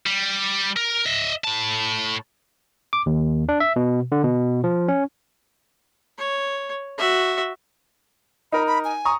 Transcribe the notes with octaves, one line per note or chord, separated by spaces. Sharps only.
G3
A#4
D#5 E5
A2 A5
D6
D#2
D4
E5
B2
D3
B2
F3
C#4
C#5
F#4 E5
D#4 A#4 B5
B5
G#5
A#5 C#6 D#6